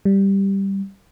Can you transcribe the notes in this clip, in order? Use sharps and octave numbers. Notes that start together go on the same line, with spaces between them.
G3